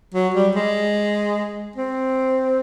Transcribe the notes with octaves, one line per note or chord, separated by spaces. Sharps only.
F#3
G3
G#3
C4